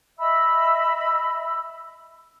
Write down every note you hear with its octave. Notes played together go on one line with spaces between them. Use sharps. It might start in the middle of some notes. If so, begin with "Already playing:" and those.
D#5 E5 B5 E6